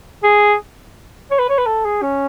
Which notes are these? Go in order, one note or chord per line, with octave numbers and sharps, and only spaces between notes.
G#4
C#5
B4
C#5
B4
A4
G#4
C#4